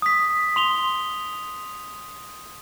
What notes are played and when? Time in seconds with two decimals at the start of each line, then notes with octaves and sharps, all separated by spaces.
0.02 D#6 B6
0.56 C6 F7 G7